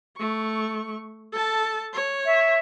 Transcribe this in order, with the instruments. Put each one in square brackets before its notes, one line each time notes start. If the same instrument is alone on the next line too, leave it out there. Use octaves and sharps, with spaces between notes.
[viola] A3 C#6
A4 A5
C#5
[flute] E5